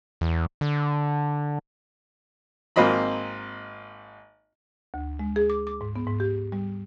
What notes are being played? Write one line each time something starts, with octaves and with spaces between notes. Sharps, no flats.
E2
D3
G#1 A#3 C4 D#5 B5
D2
G#3
G#4
D6
D6
G#2
B3
G#2
G4
G3